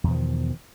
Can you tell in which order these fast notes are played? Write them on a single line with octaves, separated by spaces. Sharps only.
E2 B2 F3 D#3